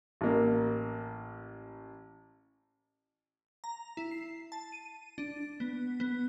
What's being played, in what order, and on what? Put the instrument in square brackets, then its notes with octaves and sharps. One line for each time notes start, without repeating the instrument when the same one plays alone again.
[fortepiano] A1 A#3
[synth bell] A#5
E4
C7
A5
D#7
D4
B3
B3